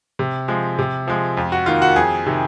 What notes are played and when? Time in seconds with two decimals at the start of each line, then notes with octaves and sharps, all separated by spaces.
0.19 C3
0.48 F3 G#3
0.79 C3
1.08 F3 G#3
1.37 F2
1.52 F#4
1.66 D#3 A#3 F4
1.82 F#4
1.96 F2 G#4
2.26 C3 D#3